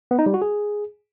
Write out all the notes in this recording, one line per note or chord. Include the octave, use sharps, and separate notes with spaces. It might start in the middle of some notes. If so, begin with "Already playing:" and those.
B3
D#4
G3
F#4
G#4